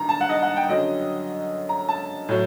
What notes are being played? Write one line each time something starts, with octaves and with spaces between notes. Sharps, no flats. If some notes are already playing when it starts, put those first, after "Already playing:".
Already playing: G2 D#3 A#5
A5
F#5
D#5
F#5
G5
F#2 D3 F#3 D#5
A#5
A5
A2 F#3